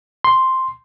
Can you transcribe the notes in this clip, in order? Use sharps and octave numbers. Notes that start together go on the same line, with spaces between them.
C6